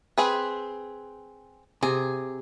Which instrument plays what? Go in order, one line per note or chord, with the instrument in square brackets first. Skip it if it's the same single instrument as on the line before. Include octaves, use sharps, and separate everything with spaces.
[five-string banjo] C4 G#4 B4
[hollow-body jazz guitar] C3 [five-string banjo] G#4